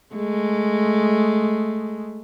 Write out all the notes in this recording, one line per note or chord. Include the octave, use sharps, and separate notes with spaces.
G#3 A3